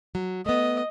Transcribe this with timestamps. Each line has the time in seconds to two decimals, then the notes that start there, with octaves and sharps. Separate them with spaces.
0.15 F#3
0.46 A3 B3 D#5